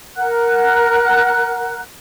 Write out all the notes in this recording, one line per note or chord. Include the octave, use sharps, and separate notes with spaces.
A#4 F#5 F#6